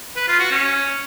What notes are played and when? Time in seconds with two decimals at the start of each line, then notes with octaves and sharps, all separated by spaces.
0.16 B4
0.28 F4
0.40 F#4
0.51 C#4